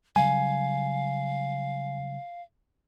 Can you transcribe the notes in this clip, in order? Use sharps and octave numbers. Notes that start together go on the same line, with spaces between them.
C#3 F#3 G3 F5 G#5